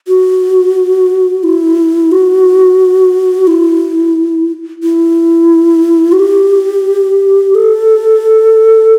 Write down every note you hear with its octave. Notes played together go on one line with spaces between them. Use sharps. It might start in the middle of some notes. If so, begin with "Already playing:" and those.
F#4
E4
F#4
E4
E4
F#4
G4
A4